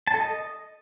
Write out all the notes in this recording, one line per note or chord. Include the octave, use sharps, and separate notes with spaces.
A5
A4
D#5